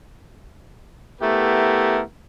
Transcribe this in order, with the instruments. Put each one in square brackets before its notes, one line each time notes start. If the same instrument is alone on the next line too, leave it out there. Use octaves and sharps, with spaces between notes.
[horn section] A3 B3 E4 G4 A#4